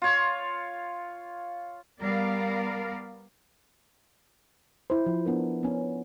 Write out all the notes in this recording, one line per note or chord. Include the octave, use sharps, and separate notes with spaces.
F4 C#5
G3 B3 A#4 D5 F5
E4 C5
F3
B3 D4 A#4
B3 C#4